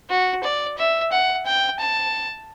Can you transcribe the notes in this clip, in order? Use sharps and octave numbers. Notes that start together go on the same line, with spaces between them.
F#4
D5
E5
F#5
G5
A5